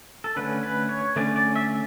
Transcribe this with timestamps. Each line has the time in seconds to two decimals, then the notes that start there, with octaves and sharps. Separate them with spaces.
0.24 A4
0.36 D3 A3 C#4 B4
0.63 B4
0.89 C#5
1.16 D3 A3 C#4 D5
1.36 D5
1.56 E5